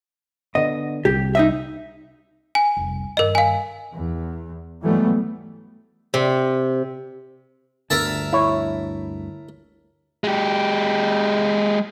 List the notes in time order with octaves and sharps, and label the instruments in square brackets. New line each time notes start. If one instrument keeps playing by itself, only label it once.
[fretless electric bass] D3 B3 [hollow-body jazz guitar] D#5
[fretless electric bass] C2 [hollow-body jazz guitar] G4
[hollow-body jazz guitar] D#4 D#5 E5
[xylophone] G#5
[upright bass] F1 C2
[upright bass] G2 D#3 [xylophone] A#4 D#5
[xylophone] F5 G#5
[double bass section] E2
G#2 E3 F#3 G3 A3 B3
[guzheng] C3
[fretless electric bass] G1 D2 D3 [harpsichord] A#4 E5 A5
[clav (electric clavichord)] E4 C#5
[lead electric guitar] G#3 G4